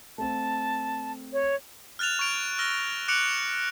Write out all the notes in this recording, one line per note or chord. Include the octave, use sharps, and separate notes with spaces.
A3 C4 A5
C#5
F6 F#6 A6 E7 F7
C#6 G#6 D7 F7
E6 F6 A#6 G7
D6 F#6 C#7 D7 F7 F#7